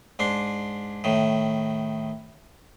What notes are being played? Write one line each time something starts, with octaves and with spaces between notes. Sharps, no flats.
G#2 D4 C6
A2 D#3